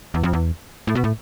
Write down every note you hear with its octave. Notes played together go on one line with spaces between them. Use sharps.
E2
F2
E2
A2
B2
A2